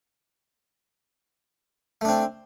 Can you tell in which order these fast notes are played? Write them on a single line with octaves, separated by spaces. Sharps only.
A3 D4 C4